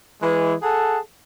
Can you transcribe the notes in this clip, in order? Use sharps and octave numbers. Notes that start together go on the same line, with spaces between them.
E3 G#3
G#4 A4 F#5 A5